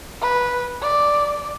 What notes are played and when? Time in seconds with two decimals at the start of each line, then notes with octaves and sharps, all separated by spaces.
0.21 B4
0.82 D5